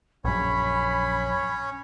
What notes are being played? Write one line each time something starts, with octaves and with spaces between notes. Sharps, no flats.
A#1 F#2 C#4 C#5 B5